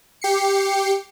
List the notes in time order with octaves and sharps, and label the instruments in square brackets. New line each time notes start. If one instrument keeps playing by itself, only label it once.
[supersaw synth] G4 C7 C#7